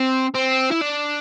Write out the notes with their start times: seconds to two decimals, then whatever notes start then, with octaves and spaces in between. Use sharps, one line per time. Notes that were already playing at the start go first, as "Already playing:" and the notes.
Already playing: C4
0.35 C4
0.72 E4
0.82 D4